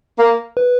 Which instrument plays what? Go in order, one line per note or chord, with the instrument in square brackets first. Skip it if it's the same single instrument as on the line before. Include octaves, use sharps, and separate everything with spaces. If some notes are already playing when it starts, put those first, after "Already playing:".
[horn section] A#3
[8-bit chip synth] B4